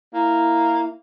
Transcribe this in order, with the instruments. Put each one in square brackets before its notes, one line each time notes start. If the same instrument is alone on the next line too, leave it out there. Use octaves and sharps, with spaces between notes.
[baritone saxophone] A#3 [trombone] E4